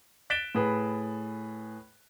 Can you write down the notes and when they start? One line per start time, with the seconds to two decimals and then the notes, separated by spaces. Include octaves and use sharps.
0.30 F#6 A6 B6 D7 E7 G7
0.55 A2 G#4 B4 B5